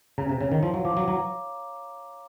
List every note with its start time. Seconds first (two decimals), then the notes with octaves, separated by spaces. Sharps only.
0.18 C#3 A#5
0.29 C3
0.41 C#3 C#5
0.52 D#3
0.63 F3 F5
0.74 F#3
0.85 F3 D6
0.97 F#3
1.08 F#3 A#5